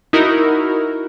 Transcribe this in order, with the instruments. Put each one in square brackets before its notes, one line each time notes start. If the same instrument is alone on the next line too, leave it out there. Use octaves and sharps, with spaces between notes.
[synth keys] D#4 E4 F#4 A#4